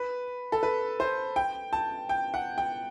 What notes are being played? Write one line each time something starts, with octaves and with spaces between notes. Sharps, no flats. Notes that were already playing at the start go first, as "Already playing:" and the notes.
Already playing: B4
A4
B4
C5
G5
A5
G5
F#5
G5